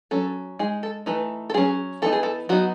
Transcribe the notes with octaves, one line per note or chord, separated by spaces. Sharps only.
F#3 C#4 A4
G#3 D#4 G#4
A4
E3 A3 D#4 B4
A4
F#3 C#4 G#4
E3 B3 D#4 A4
G#4
A4
F#3 B3 D#4 F#4